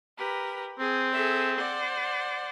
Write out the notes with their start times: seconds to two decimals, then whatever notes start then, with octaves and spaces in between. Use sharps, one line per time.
0.17 G4 A#4 B4
0.79 C4 G#4
1.12 G#4 A4 E5
1.57 C5 D5 F#5